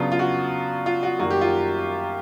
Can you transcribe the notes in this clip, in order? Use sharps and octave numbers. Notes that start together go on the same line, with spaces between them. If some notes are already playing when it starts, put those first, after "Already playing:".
Already playing: C#3 F#3 B3 D4 F4
F4
F#4
F4
F#4
F#2 D#3 G3 A#3 F#4
G4
F4